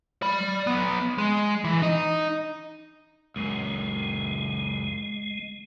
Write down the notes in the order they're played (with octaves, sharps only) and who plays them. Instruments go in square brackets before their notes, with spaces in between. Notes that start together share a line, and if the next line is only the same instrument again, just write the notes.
[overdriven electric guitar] D5 B5
F#3 B3
G#3
E3
D#4 D#5
[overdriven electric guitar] C#2 F#2 [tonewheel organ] G#3